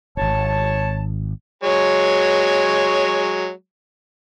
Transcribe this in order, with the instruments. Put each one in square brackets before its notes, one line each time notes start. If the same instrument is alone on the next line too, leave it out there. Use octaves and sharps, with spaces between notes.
[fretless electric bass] D#1 G#1 [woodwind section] C#5 A5
[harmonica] F#3 G#3 C#5